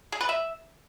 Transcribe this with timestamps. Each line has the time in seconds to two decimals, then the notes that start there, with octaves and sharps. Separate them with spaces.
0.12 G#4
0.21 B4
0.29 E5